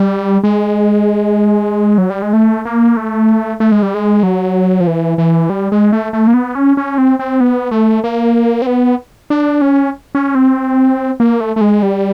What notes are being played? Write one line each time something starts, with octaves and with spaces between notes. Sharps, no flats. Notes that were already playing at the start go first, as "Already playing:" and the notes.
Already playing: G3
G#3
F#3
G3
G#3
A3
A#3
A3
A3
G#3
G3
G#3
F#3
F3
E3
E3
G3
G#3
A3
A3
A#3
B3
C#4
C#4
C4
C4
B3
A3
A#3
C4
B3
D4
C#4
C#4
C4
A#3
A3
A3
G#3
G3